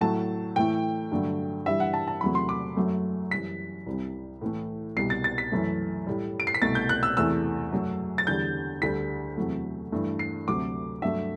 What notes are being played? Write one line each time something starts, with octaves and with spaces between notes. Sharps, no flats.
A2 F#3 A3 A5
A2 E3 A3 G5
G2 D3 F#3 A3
G2 E3 G3 E5
F#5
A5
A5
E2 C3 F#3 A3 B5
C6
D6
F#2 F#3 A3
F#2 E3 G3 B6
C2 C3 G3
A2 E3 A3
C2 B2 G3 C7
A6
A6
B6
F#2 E3 A3
A2 G3
D7
C7
B6
C2 B2 A3 A6
G6
F#6
E6
E2 C3 E3 A3 E6
F#2 F#3 A3
A6
E2 D3 G3 G6
D2 D3 G3 B6
E2 C3 F#3 A3
G2 E3 A3
C7
D2 C3 F#3 A3 D6
G2 F#3 A3 E5